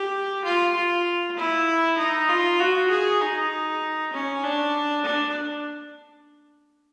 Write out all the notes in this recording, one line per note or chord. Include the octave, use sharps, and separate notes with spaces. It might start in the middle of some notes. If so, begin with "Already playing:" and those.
Already playing: G4
F4
F4
E4
D#4
F4
F#4
G#4
D#4
C#4
D4
D4